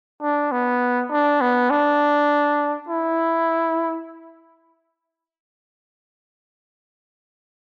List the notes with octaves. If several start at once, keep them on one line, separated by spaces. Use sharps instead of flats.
D4
B3
D4
B3
D4
E4